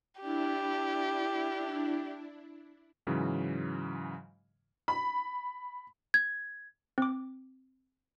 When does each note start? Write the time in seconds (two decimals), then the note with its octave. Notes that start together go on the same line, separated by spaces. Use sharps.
0.21 D4 E4 G4
3.07 G#2 C#3 E3 F#3
4.88 B5
6.14 G#6
6.98 C4 D6